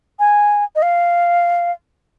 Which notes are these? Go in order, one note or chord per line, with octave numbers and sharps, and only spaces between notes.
G#5
D#5
F5